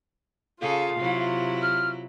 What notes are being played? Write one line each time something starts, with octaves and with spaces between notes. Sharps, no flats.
C#3 F4 G#4 A4 F5
C3 F#3 E4
F6